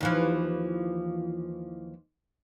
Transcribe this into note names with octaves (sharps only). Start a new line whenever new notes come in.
D#2 E3 F3